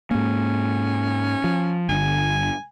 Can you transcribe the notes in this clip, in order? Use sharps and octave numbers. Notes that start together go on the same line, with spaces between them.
G#2 A#3 C#4
F3
G1 D3 G#5